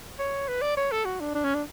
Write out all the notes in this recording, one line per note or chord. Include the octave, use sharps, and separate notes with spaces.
C#5
B4
D5
C#5
A4
F#4
D4
D4
C#4
D4